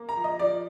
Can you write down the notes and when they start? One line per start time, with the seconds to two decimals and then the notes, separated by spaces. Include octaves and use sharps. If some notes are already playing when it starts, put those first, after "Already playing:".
Already playing: A#3
0.09 A#5
0.16 F3
0.24 D#5
0.39 F3 D5